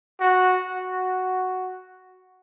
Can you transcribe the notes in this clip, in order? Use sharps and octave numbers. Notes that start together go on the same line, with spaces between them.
F#4
F#4